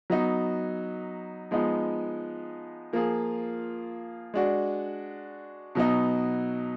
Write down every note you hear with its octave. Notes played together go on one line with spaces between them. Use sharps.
F#3 B3 D#4
F3 G#3 B3 D#4
F3 A#3 F4 G#4
G#3 D4 F#4
B2 F#3 B3 D#4